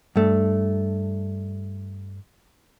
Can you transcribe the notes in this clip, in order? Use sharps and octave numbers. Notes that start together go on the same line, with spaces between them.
G2 A3